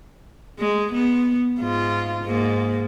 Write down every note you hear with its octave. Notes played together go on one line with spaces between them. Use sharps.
G#3
B3
G#2 F4
G#2 A#3